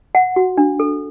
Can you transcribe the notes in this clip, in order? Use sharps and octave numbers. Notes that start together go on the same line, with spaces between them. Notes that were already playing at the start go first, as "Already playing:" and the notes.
F#5
F#4
D4
A4